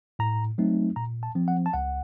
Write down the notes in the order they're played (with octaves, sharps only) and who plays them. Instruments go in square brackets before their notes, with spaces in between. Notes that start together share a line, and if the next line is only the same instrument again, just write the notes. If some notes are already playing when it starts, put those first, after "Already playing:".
[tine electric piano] A2 A#5
F#3 A3 C4 D#4
A#2 A#5
A5
F3 C4
F#5
A5
C#2 F#5